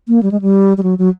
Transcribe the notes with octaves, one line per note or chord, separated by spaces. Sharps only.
A#3
G3
G#3
G3
G3
F#3
F#3